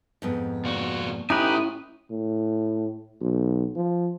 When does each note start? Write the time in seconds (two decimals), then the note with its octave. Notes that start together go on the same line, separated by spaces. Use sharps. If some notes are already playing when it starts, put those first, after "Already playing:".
0.22 F2 G#2 B3
0.65 A#2 F#4
1.30 A2 C#4 D#4 E4 G4 B4 G#5 D#6
2.10 A2
3.21 B1
3.76 F3